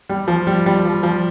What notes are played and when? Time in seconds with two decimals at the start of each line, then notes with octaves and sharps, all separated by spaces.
0.09 G3
0.28 F3
0.47 G3
0.66 G3
0.85 F3
1.03 F3